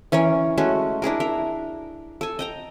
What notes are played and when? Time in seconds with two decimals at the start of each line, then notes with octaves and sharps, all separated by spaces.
0.12 E3 C#4 A#4 C#5
0.58 G#3 A3 C#4 F#4
1.02 D4 E4 G#4 A#4
1.20 A#4 E5
2.21 A4 G#5
2.39 D#5 G5 A#5